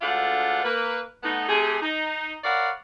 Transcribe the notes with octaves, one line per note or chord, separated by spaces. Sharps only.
D2 G#3 D4 F4 A4 F#5
A#3 B4
A3 B3 D#4
C3 A3 G4 G#4
D#4
A#4 B4 C#5 D5 F5 F#5